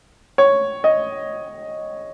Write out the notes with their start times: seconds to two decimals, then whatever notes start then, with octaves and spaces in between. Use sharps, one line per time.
0.38 C#5
0.84 D#5